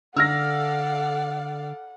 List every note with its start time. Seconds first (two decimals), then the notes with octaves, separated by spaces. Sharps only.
0.16 D3 A4 D5 F5 F#5 E6 F6 A#6